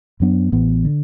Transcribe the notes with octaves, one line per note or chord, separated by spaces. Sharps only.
F#2 F#3 B3 D4
A1 A2 E3 B3
D3